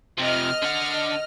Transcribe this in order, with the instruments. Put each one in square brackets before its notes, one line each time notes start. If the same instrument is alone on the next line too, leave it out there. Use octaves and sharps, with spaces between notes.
[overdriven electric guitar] C3 F3 [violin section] D#5 F6
[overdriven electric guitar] D3 F#5